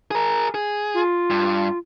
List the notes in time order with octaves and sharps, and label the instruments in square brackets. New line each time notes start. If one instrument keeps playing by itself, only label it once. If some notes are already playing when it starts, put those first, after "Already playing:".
[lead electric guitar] G#4 A#4
G#4
[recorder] F4
[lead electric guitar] G2